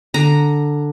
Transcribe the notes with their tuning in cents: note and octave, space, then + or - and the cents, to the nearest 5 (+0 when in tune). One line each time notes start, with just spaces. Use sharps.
D3 +5 A#5 +0